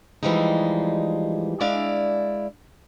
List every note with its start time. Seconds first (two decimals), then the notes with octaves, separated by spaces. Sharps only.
0.23 E3 F3 G3 G#3 D#4
1.60 G#3 D4 E4 D5 F5